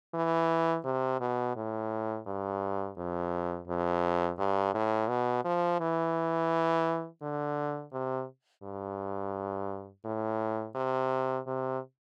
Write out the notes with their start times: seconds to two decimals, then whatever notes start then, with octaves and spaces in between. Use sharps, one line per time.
0.14 E3
0.85 C3
1.21 B2
1.56 A2
2.27 G2
2.97 F2
3.68 F2
4.39 G2
4.74 A2
5.09 B2
5.45 F3
5.80 E3
7.22 D3
7.93 C3
8.64 G2
10.05 A2
10.75 C3
11.47 C3